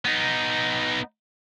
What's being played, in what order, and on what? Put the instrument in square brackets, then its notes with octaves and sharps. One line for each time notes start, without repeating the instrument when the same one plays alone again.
[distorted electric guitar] B3 D#4